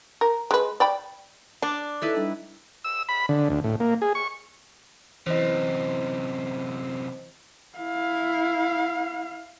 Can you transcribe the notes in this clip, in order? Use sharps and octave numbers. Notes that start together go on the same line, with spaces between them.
A#4
G#3 B4
D5 G5 B5
D4 D6
D#4 E4 A4 B4
G3 D4
E6
B5
D3
D2
A2
A#3
G#4
C#6
F#2 C3 E3 C5 D#5
E4 F5